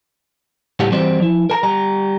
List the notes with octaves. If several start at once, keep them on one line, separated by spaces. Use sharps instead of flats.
C#2 A2 G3 D4 G4 F#5
E3 G3 C4 F#4 C5 D5
F3 E4
A#4 A5 A#5
G3 A#5